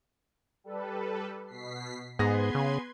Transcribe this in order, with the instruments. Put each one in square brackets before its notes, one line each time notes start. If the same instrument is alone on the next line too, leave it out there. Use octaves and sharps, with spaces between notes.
[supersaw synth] G3 A4 B4
B2 B6 C7
[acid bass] G#2 [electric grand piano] B3 G#4 A#6 [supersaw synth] B4 C6 G#6
[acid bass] C#3